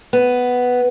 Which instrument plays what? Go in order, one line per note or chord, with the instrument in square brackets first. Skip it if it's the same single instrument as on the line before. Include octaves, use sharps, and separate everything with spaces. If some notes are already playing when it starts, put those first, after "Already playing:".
[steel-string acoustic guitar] B3